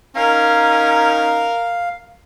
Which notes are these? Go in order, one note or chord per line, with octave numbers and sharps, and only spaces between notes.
C#4 D#4 A#4 F5